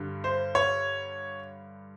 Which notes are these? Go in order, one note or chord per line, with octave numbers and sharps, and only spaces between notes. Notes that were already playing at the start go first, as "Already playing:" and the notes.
Already playing: G2 D3 G3
C5
C#5